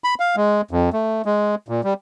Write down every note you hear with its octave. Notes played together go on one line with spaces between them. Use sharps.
B5
F5
G#3
F2
A3
G#3
A#2
G3